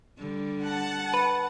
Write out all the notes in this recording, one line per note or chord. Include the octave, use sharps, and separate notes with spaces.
D3 G3
F#5 A5
B4